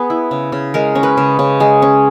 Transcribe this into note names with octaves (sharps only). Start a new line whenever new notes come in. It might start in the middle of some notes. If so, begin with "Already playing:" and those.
Already playing: B3 G#4 B4
E4
C#3
C#3
G#3 A#4
C#4
B4
C#3
C#3
G#3 G#4
C#4